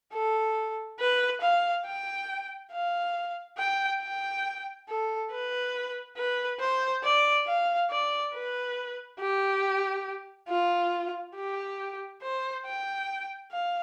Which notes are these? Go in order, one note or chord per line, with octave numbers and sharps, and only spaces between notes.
A4
B4
F5
G5
F5
G5
G5
A4
B4
B4
C5
D5
F5
D5
B4
G4
F4
G4
C5
G5
F5